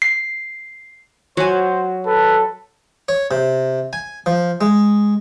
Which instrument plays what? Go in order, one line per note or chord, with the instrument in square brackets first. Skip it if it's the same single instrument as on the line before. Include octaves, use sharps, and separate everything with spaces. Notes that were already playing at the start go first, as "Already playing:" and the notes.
[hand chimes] C7
[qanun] F#3 [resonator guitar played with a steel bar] F#4 G#5 [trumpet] C5
[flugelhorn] A4 [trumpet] B4
[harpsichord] C#5
C3
G#5
F3
G#3